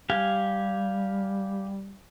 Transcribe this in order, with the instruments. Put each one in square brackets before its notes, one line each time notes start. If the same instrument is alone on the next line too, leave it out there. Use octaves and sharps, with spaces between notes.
[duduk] G3 [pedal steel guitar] G4 F5 G#5